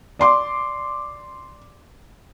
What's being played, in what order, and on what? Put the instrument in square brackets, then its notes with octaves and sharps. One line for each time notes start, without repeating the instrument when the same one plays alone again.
[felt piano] D5 C6 D6